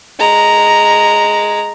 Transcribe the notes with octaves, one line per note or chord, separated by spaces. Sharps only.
G#3 A#5